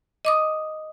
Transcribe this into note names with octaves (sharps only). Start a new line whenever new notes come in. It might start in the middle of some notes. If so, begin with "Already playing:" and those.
D#5 D6 D#6